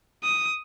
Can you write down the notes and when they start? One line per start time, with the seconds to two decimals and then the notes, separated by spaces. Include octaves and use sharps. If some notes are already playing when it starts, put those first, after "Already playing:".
0.23 D#6